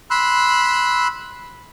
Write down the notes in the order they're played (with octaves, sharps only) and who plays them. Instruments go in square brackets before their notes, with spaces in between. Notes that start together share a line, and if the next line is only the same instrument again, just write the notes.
[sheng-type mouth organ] B5 C6 E6 F#6